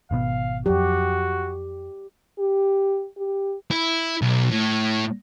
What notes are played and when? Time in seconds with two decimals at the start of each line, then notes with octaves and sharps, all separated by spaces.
0.11 G#1 B2 B3 F5
0.66 F2 F#3 F#4 G4
2.39 G4
3.17 G4
3.71 E4
4.22 B1
4.50 A2